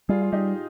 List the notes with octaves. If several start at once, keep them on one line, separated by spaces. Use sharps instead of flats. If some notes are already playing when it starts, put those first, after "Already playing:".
G3 F4 G#4
F4
G3 D#4 G4